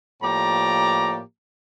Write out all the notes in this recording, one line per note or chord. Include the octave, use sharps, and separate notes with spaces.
A2 F3 A#3 G4 D5 A#5